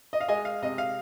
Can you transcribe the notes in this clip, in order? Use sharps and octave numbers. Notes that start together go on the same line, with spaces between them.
D#5
F5
G#3 D#5 G#5
F5
C3 D#5
F5